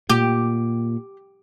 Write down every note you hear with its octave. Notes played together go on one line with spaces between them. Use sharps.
A#2 G4